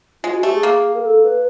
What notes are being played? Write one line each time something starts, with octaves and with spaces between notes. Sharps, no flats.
G#3 F4
F#4
A3 G4
G#4
A#3
A#4
A4
B4